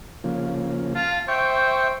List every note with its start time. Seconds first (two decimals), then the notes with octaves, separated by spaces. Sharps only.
0.24 C#3 F3 A#3
0.95 F4 F5 A5
1.28 C5 E5 G5 C#6